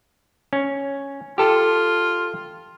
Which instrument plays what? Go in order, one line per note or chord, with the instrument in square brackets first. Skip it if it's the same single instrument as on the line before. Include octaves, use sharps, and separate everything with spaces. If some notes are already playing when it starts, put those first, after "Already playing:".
[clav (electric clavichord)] C#4
[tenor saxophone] F4 [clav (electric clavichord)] G4 A4